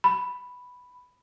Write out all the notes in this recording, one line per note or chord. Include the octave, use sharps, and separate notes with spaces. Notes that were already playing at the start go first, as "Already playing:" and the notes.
B5